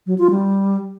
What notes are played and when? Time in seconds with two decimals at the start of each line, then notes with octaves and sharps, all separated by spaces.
0.07 F#3
0.18 F4
0.30 G3